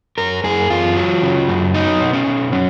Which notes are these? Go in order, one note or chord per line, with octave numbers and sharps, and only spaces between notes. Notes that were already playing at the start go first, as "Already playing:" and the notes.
F#2 A#4
F#2 G#4
F#2 F4
F#3
C#3
F#2
F#3 D#4
B2
C#4
B2
F#3 C#4